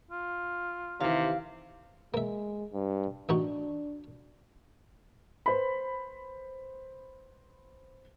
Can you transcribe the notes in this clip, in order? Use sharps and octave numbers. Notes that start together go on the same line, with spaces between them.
F4
D#2 C3 E3 F5
G#3 A#3 E5
G2
A1 D4 D#4 F#4
B4 C5 B5